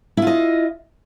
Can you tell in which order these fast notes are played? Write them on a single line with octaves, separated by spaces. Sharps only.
E4 F4 D#5